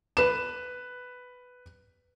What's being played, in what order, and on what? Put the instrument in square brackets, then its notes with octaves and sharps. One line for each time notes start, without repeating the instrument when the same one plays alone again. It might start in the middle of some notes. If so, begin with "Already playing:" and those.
[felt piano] B4 E7